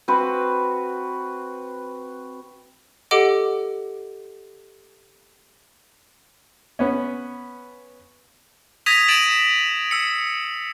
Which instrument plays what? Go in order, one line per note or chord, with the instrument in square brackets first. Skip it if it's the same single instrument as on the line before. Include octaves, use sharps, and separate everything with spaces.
[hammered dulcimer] C4 F#4 B4
[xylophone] G4 A4 D#5 F#5 D6 D7
[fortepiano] B3 C#4
[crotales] D#6 G#6 A#6 B6 D#7 F7
A6 D7 E7 F#7
E6 C#7